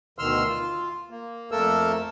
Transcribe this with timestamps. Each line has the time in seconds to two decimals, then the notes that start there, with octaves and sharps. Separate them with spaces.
0.19 D2 B2 D#3 C6 E6 F6
0.48 F4
1.11 A#3
1.51 F2 A3 A#3 A4 A#4 E6